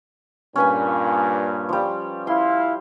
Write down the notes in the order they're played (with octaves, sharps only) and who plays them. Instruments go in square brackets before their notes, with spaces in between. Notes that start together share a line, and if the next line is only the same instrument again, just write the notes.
[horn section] G2 A#2 [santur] C#4 B4 G#5
[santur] F3 G3
[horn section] E4 F5 [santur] C6